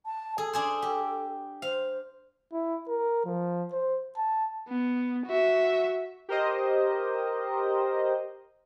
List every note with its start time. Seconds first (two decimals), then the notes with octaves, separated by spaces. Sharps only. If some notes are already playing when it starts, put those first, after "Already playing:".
0.05 A5
0.38 G#4 A4
0.53 D4 G#4 C5
0.82 G4
1.62 C5 F5
2.53 E4
2.88 A#4
3.25 F3
3.72 C5
4.17 A5
4.68 B3
5.26 F#4 E5
6.29 G4 A#4 C5 D#5